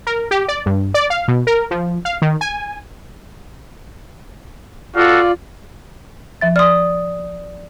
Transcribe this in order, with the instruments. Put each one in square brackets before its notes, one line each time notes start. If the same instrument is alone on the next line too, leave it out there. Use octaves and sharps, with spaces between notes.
[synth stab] A#4
G4
D5
G2
D5
F5
B2
A#4
F3
F5
D#3
G#5
[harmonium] F4 D5 [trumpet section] F#4 A4 F5
[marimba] F3 E5 A6
[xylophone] D5 D#6 [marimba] C6 F6